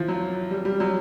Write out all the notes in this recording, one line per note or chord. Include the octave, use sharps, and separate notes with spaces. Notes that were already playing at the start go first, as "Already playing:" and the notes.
Already playing: E3 F3
F#3
G3
G3
F#3